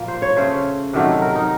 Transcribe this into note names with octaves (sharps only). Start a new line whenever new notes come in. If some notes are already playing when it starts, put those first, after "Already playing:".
Already playing: A#2 F3 A#3
C5
C#5
C#3 A3 C5
C3 D#3 F#3 A3
A#4
D#4